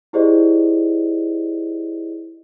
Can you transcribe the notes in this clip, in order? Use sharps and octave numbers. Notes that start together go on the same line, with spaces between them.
E4 G4 G#4 C5 D5 D#5